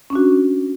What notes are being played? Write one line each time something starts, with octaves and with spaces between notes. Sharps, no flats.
C#4 D4 F#4